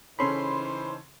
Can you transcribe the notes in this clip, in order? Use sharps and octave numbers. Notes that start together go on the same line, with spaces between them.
C#3 E3 C#4 D#4 A4 C5 B5 C6